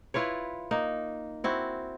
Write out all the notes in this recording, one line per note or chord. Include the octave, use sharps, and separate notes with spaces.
E4 F4 B4 C#5
A#3 D#4
C4 E4 F#4